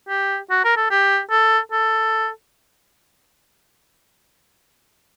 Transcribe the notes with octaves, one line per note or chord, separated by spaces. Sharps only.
G4
F#4
A#4
A4
G4
A4
A4